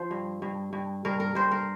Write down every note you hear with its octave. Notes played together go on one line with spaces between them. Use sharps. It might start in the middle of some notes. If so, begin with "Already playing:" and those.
Already playing: F3 C5
G2
G2
G2
G2 A#4
A#4
G2 C5
A#4